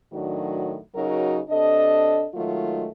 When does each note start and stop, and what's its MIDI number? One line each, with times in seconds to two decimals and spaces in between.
0.13 0.77 45
0.13 0.77 51
0.13 0.77 54
0.13 0.77 62
0.13 0.77 66
0.95 1.39 49
0.95 1.39 54
0.95 1.39 63
0.95 1.39 66
0.95 1.39 70
1.49 2.26 48
1.49 2.26 62
1.49 2.26 69
1.49 2.26 75
2.34 2.87 51
2.34 2.87 54
2.34 2.87 56
2.34 2.87 57
2.34 2.87 65